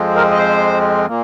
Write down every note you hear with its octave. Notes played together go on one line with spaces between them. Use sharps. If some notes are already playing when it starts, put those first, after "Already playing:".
Already playing: F2 F3 G#3 C4
A#4
D#5
C5
A#2 A#3